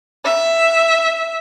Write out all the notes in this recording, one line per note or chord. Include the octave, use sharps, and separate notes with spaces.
E5